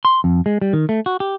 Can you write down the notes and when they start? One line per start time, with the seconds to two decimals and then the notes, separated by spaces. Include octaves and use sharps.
0.05 C6
0.24 F2
0.46 G#3
0.61 G3
0.73 D#3
0.89 A3
1.06 F#4
1.20 G4